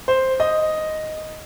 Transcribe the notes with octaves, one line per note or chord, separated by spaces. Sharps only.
C5
D#5